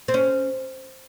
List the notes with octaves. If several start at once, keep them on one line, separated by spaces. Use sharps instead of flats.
C4
C#4